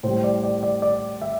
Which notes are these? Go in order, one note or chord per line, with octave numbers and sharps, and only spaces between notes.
A2 G3 C5
D5
D5
D5
D5
E5